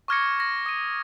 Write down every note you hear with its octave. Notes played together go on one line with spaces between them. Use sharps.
C#6 D6 F6 G#6 A#6 C#7
A#6
D#6 D#7